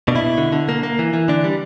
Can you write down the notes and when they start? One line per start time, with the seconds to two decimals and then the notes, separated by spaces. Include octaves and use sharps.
0.08 B2 D4
0.16 E4
0.23 B2
0.38 D3
0.52 D3
0.69 A#3
0.83 A#3
0.99 E3
1.14 E3
1.28 D3 D4
1.44 G3